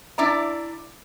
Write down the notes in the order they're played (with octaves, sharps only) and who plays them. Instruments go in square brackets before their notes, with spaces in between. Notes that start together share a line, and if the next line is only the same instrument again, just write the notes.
[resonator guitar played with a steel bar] D4 E4 D5 A#5